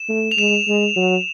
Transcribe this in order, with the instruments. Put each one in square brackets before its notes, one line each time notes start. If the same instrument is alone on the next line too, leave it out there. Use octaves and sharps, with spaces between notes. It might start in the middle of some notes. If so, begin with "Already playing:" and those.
Already playing: [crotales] E7
[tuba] A3
[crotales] F7
[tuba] G#3 [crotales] E7
[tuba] G#3
F#3